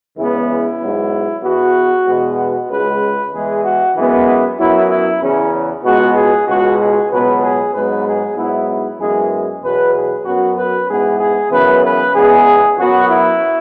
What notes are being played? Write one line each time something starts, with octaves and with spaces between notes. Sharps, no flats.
E2 C#3 E3 G#3 B3 E4
E4
G#2 F#3 B3
E2 E3 B3 F#4
E2 B2 G#3 B3
F#4
C#2 C#3 G#3 B4
E2 E3 G#3 G#4
F#4
F#2 E3 G#3 B3
F#2 F#3 B3 E4
E4
E2 C#3 E3 C#4
C#2 B2 G#3 B3 F#4
G#4
C#2 B2 G#3 F#4
G#4
C#2 B2 F#3 B3 B4
G#4
G#2 F#3 B3 B4
G#4
G#2 F#3 B3 E4
E4
F#2 E3 G#3 B3 G#4
E2 B2 F#3 B3 B4
G#4
F#2 F#3 B3 F#4
B4
G#2 E3 B3 G#4
G#4
F#2 C#3 E3 B3 B4
B4
E2 C#3 G#3 B3 G#4
F#2 F#3 B3 F#4
E4